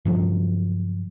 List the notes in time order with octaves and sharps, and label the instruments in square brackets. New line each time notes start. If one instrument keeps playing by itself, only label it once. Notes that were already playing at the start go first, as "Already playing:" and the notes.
[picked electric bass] G2 C#3 F3 F#3